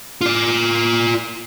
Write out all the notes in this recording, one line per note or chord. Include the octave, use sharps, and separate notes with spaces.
F4 D5